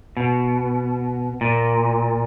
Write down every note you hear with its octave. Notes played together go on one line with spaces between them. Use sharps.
B2
A#2